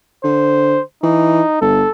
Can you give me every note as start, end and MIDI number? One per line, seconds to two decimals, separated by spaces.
0.24 0.77 50
0.24 0.82 72
1.03 1.42 52
1.03 1.57 63
1.61 1.85 31
1.61 1.90 69